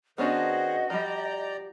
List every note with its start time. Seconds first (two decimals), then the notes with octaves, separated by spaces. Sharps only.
0.18 D#3 B3 C#4 D4 F#4 G#4 C5 D#5
0.90 F3 G3 D5 G5 A#5